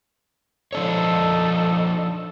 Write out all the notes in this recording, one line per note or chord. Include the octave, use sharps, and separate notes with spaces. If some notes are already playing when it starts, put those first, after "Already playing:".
F3 D4 D#4 A4 C#5